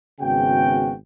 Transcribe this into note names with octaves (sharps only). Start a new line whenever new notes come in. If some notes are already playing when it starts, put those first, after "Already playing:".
G#1 C#3 B3 F#4 G5